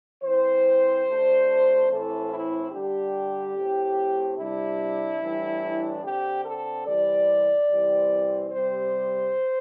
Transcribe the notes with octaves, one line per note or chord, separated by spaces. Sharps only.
E3 C4 C5
C3 A3 D4
A2 E3 C4 A4
E4
D3 G3 D4 G4
A2 A3 C4
C3 G3 D4 E4
A2 E3 G3 D4
D3 C4 G4
A4
C3 E3 G3 D5
C3 E3 G3 C4
C3 G3 C4 C5